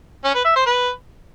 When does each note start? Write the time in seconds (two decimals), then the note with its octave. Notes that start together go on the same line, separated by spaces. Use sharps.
0.24 C#4
0.35 B4
0.45 E5
0.56 C5
0.66 B4